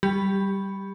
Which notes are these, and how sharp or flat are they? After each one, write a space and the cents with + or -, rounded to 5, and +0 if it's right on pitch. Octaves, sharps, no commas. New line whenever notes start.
G3 -10 G4 +15 B5 +0